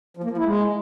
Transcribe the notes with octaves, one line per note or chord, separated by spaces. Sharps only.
F3
A#3
F3
E4
G#3